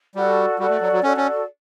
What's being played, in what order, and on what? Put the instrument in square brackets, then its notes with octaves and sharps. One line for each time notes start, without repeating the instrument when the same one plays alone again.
[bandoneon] G3 [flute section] F#4 A4 D5
[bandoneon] G3 [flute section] F#4 A4 D5
[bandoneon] A3
F#3
F#3
[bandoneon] C#4 [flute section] F#4 A4 D5
[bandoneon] C#4